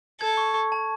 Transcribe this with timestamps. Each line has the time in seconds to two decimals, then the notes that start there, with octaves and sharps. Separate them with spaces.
0.21 A4 G#6
0.37 C#6
0.54 C#6
0.72 A5